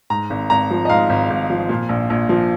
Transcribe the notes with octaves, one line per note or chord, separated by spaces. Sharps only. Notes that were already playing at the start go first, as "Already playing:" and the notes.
G#2 A#5
G#1
G#1 A#5
F3
D#5
G#2 F5
G#1
G#1
F3
A#2
A#1
A#1
F3